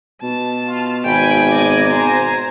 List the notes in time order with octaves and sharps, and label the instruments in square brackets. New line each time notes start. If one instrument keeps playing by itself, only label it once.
[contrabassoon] B2 [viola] A5
[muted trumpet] F4
[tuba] G#1 [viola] G5 B5 [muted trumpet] G#5
[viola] D5 D#5
C5 A#5